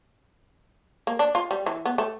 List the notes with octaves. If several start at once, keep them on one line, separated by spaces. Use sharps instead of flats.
A#3
D4
F4
G3
E3
B3
A3